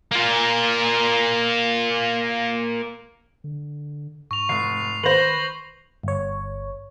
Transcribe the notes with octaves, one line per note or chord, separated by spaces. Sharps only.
A#3 F4
D3
G#2 C#6 F7
F1 C7
D#3 B4 C5 A#6 F#7
G1 C#5